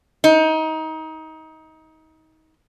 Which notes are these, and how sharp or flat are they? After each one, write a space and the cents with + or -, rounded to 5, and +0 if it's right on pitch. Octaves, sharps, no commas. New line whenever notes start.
D#4 +25